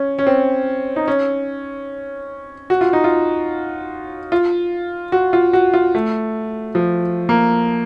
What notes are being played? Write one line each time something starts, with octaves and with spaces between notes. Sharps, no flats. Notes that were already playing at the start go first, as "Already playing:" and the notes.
Already playing: C#4
C#4
C4
D#4
C#4
F#4
F4
D#4
F4
F4
F#4
F4
F#4
F4
A3
F3
A#3